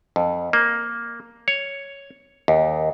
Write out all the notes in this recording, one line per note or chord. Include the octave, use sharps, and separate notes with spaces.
F2
A#3
C#5
D#2